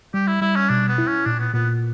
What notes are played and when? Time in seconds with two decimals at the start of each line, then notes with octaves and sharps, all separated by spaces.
0.14 G3 G4
0.27 E4
0.41 G3 E4
0.56 C#4
0.69 B2 D4
0.88 B3
0.98 E4
1.07 C#4
1.26 A#2 D4
1.40 B3
1.54 A#2 B3